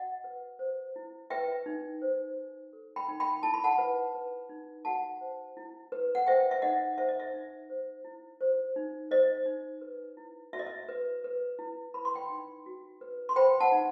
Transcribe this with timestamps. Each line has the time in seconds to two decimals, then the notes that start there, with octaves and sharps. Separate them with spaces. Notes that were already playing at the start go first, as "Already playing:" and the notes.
Already playing: F#4 D#5 F#5
0.24 B4
0.59 C5
0.96 E4
1.30 B4 E5 G5
1.66 D#4
2.02 C5
2.37 D#4
2.73 A4
2.96 G5 B5
3.08 D#4
3.20 G5 B5
3.43 E4 A5
3.54 B5
3.64 F#5 A5
3.78 B4
4.15 B4
4.49 D#4
4.85 F#4 F#5 A5
5.21 C5
5.57 E4
5.92 B4
6.15 F#5
6.27 C5 E5 G5
6.51 E5
6.62 D#4 D#5 F#5
6.98 C5 E5
7.08 D#5
7.20 E5
7.33 D#4
7.70 C5
8.04 E4
8.41 C5
8.76 D#4
9.11 C5 D#5
9.46 D#4
9.81 B4
10.17 E4
10.53 F#4 E5
10.59 D#5
10.67 E5
10.89 B4
11.24 B4
11.59 E4
11.94 B4 B5
12.05 C6
12.14 G5 B5
12.30 D#4
12.66 F#4
13.01 B4
13.29 C6
13.36 C5 G5 B5
13.60 F#5 A5
13.72 D#4